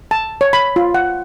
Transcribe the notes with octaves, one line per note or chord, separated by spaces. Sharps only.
A5
C#5
B5
F4
F#5